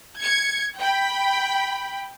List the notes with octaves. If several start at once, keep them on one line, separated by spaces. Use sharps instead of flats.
G#6 C#7
G5 B5